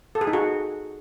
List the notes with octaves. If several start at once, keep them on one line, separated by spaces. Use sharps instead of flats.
A4
G#4
D#4
F#4